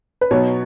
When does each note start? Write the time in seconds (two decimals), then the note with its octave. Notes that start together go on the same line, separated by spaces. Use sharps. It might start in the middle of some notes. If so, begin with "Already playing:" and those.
0.21 B4
0.31 B2 F#3 B3 D#4 C#5